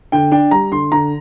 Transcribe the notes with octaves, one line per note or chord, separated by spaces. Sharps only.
D3 G5
D4 G5
G3 A#5
D3 C6
D3 A#5